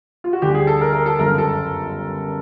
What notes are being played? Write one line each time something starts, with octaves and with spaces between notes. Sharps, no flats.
F4
F#4
D2 D3 G3 G4
G#4
A4
A#4
A#4
A4
G1 F#2 C#3 A#4
A4